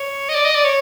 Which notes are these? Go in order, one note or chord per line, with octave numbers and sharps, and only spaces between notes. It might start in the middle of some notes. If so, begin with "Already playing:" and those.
Already playing: C#5
D#5
D5
D#5
D5
C#5